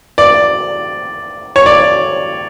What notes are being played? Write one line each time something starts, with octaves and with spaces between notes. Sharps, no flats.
D5
C#5
D5